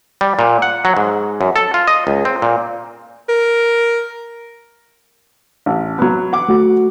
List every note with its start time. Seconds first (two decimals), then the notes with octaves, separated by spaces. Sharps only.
0.21 G3
0.39 A#2
0.62 F#5
0.85 F#3
0.97 G#2
1.41 F#2
1.56 A4
1.74 F4
1.87 D#5
2.07 C#2
2.25 C4
2.42 A#2
3.29 A#4
5.66 A1
5.99 F#3 B3
6.33 F#5 D6
6.49 A3 F#4